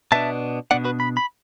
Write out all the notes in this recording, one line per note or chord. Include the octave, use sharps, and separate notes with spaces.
B2 B3 D4 E5 A5
B2 B3 D4 D5 F#5
F#4 B4
B5
B5